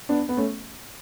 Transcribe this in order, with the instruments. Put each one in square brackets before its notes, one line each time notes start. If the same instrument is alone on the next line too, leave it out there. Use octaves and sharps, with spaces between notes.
[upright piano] B3 D4
B3
A3 C#4